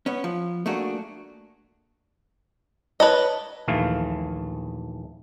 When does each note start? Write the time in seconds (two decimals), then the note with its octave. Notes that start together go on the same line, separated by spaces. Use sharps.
0.06 B3 C#4
0.24 F3
0.66 A3 A#3 D4 F#4 G#4
3.00 B4 C#5 D#5 A5
3.68 A#1 D#2 E3 A3 F5